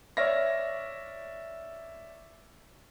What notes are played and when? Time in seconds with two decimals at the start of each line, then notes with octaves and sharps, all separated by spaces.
0.17 C#5 D5 E5 F6 A#6